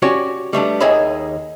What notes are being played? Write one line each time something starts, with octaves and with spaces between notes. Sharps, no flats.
C#4 F#4 G4 C#5 D5
G3 A3 B3 D4
D#2 D#3 G#4 C#5 E5 B5